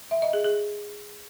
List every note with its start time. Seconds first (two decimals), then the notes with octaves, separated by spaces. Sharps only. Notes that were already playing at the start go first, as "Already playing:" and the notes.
0.11 E5
0.22 D#5
0.33 G#4
0.44 G#4